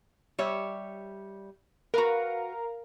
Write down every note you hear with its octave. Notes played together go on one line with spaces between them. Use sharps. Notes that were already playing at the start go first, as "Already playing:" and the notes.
G3 C#5 E5
F#4 A#4 B4 F5 A#5